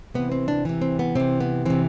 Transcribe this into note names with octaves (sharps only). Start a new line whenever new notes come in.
C3 E3 B3
C4
D4
C3 E3
C4
B3
C3 E3 C4
B3
C3 E3 C4